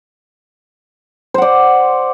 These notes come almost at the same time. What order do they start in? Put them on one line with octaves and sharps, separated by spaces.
C5 F#5 D5